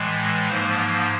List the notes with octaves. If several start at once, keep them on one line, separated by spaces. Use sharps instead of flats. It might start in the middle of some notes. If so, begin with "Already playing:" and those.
Already playing: A2 E3 G#3
G#2 F3 A#3 C5